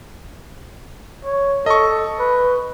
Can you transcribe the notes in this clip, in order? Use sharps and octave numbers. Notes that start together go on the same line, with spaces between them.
C#5
A4 D#5 C#6
B4